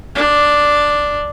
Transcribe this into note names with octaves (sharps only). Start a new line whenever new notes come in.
D4